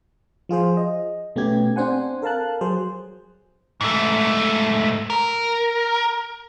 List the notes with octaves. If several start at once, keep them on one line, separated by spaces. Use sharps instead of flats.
F3 F4 G#4 C5
D#5
B2 A3 B3 C#4 G4 G#6
C4 D4 C5 F#5 G#5
A4 A#4 F5 A5 F#6
F#3 G#4 C5
G#2 A3
A#4